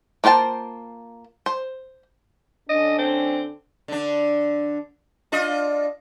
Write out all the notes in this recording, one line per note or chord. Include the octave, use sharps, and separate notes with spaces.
A#3 F4 C5 G5 A5
C5
D3 C#4 D4 D#5
C4
D3 D4
D4 F4 D#5